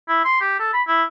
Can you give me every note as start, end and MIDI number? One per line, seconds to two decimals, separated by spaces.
0.08 0.23 64
0.25 0.40 84
0.41 0.55 67
0.59 0.71 69
0.73 0.82 83
0.87 1.03 64